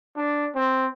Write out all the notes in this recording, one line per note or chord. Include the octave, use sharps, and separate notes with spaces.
D4
C4